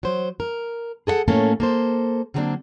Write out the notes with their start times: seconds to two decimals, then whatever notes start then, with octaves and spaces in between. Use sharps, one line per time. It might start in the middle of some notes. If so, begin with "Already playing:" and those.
0.03 F#3 C5
0.40 A#4
1.07 G#4 A4 D#5 F#5
1.28 A2 A3 A#3 C#4 A4 C#5
1.60 A#3 A4 C5
2.34 D3 F#3 G3 A#3 C4 D4